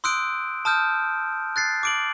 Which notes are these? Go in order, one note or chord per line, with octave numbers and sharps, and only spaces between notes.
C6 D#6 E6 F#6 G6 D7
A5 D#6 F6 G6
F#6 A6 C7
D6 D7 F#7